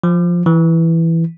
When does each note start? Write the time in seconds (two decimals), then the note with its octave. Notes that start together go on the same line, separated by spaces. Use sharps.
0.04 F3
0.46 E3